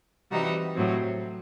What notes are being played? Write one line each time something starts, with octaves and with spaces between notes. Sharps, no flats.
C3 E3 G3 D#4 F#4
A2 F#3 C4